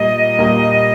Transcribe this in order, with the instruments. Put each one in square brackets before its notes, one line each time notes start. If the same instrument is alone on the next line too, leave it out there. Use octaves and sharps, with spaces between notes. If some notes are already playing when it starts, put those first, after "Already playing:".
Already playing: [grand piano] A#2 G3 A#3 [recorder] D#5
[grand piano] A#2 G3 A#3